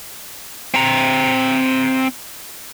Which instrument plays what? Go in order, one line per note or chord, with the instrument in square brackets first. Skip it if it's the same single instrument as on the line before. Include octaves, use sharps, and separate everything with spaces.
[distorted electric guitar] C4 A#5